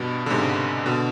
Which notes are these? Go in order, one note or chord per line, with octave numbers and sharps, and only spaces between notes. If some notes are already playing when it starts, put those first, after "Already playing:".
Already playing: G2 B2
D3
G#2 C3
B2 D3